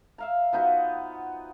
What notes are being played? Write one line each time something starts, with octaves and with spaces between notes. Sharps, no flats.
E5 F5 A#5
F3 B3 D#4 F#4